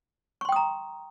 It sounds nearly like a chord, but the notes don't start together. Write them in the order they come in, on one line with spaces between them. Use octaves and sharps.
C#6 C6 G5 D#6 A#5